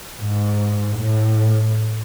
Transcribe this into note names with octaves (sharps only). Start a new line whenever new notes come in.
G#2
A2